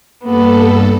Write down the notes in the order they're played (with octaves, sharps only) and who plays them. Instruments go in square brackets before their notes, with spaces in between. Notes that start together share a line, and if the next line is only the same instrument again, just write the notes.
[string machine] G2 A4 [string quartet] A#3 B3